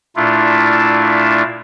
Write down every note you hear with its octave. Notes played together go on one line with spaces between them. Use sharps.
A#2 A3 D4 E4 F4